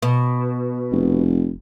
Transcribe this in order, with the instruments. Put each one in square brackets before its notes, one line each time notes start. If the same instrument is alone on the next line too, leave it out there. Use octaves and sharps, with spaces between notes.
[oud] B2
[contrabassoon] F1